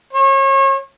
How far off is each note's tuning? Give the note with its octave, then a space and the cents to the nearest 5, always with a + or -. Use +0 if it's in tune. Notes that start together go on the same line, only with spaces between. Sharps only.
C#5 -35